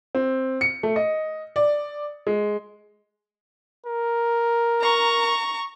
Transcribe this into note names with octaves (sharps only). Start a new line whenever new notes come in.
C4
C#7
A3
D#5
D5
G#3
A#4
A#5 C#6